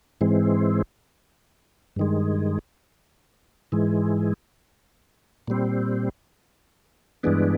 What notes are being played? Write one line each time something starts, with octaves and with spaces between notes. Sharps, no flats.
G#2 E3 G#3 C4
G2 D#3 G#3
G#2 E3 G#3
A#2 G3 C4
G2 E3 G#3 B3 D4